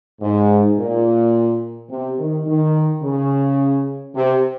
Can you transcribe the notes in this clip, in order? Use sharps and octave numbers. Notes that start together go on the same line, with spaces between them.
G#2
A#2
C3
D#3
D#3
C#3
C3